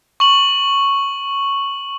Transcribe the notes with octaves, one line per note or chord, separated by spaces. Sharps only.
C#6 F#7